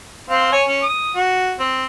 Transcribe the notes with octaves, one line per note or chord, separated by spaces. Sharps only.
C4 C5 F5
C#5 G#5
C#4
D#6
F#4
C4